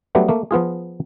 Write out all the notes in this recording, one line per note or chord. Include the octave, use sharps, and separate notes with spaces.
F#3 G3 A3 B3 D4
A3 A#3
F3 B3 F4 G#4